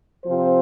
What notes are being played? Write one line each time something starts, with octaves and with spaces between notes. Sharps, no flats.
C3 F3 C4 F4 C5